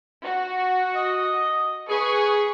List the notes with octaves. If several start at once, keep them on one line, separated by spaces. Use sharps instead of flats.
F#4
D#5
G#4 B4 C#6